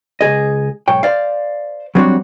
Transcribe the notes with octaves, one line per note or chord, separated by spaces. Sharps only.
C#2 A#2 G#4 D#5
B1 G#2 C#5 G5
C5 D5 F5
F#3 G3 C4 D4 F#4 C#5